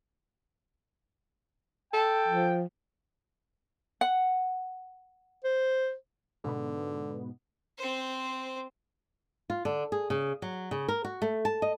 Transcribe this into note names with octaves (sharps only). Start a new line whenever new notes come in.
A4 G5
F3
F#5
C5
G#2 B2 D3 B3
C4 C5
F4
D3
G#4
C#3
F#3
C#3
A#4
F#4
A3
A5
D#5